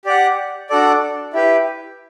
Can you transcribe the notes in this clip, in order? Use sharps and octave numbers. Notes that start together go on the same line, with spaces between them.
G4 D5 F#5
D4 F#4 A4 D5
E4 G4 B4